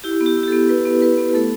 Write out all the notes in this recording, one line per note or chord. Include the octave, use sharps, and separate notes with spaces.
E4 G4
B3
G4
E4
G4
B3 A4
E4 B4
B3
E4 B4
B3
A3 A4